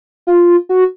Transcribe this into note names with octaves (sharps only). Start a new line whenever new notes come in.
F4
F#4